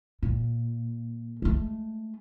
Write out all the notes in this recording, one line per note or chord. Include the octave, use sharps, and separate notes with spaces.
A#2
G#3 A3